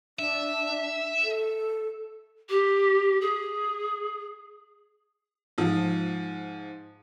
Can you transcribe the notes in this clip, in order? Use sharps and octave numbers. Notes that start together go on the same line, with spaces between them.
D4 E5
A4
G4
G#4
G#2 F3